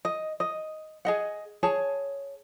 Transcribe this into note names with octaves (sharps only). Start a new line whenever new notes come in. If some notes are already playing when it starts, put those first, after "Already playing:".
D#5
D#5
G#4 D#5 F#5
G#4 C#5 A5